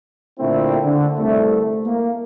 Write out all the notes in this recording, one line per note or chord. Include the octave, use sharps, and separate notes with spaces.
A#2 D3 A3 C4 E4
D3
C2 A3
A#3